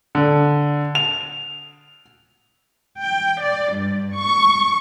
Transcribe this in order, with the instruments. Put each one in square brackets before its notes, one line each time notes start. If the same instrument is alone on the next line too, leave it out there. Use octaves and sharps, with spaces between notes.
[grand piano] D3
F7
[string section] G5
D5
G2
C#6